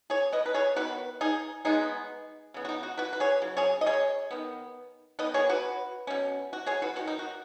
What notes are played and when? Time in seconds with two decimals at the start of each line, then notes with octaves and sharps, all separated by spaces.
0.10 G#4 C#5
0.33 B4 D#5
0.46 B4
0.54 G#4 C#5
0.76 D#3 B3 F#4 B4
1.21 D#4 G#4
1.65 B2 G#3 B3 D#4 G#4
2.54 C#3 B3
2.65 F#4
2.69 D#4
2.83 F#4
2.97 F#4 B4
3.13 B4
3.20 G#4 C#5
3.42 C#3 F#3
3.57 G#4 C#5
3.81 D#5
3.86 G#4 C#5
4.31 D#3 B3
5.19 D#3 B3 B4 D#5
5.34 G#4 C#5
5.49 F#4 B4
6.07 B2 F#3 C#4
6.53 F#4
6.66 G#4 C#5
6.82 F#4 B4
6.96 D#3 B3 F#4
7.07 D#4
7.19 F#4